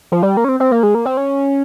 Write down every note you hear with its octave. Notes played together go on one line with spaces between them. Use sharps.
F3
G3
A#3
C#4
C4
C4
A#3
G#3
A#3
C4
C#4